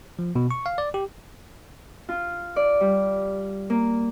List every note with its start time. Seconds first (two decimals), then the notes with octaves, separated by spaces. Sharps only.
0.19 F3
0.36 B2
0.51 C#6
0.66 F5
0.78 D5
0.94 G4
2.09 F4
2.56 D5
2.80 G3
3.70 A#3